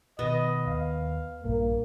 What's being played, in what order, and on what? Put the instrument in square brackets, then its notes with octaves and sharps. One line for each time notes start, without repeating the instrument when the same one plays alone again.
[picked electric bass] B2 D#3 [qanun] B3 [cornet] D#5
[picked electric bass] D#2 [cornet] F5
[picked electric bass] A#1 G2 [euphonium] A#3